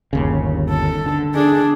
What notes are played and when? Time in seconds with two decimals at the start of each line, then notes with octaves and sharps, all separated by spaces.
0.13 G1 D#2 C#3
0.70 A4
1.06 D3
1.35 D4 G#4